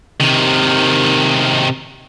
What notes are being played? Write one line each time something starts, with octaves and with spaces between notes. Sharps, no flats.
C3 D#3